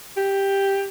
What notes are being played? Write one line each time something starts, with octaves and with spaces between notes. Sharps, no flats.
G4